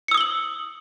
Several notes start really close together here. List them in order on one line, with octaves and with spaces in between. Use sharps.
C#7 E6 D#6 G7 F#7